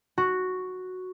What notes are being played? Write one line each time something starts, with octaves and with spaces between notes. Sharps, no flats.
F#4